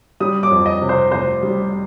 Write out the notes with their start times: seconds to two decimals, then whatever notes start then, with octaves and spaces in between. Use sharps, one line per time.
0.20 G3 D#6
0.43 D6
0.51 F2
0.66 D#5
0.82 C3
0.89 C5
1.12 F1 C5
1.43 G3